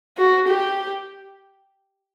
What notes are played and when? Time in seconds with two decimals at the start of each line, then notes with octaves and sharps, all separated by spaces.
0.17 F#4
0.48 G4